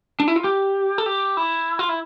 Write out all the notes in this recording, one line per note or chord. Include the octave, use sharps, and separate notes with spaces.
D4
E4
F4
G4
A4
G4
E4
F4
E4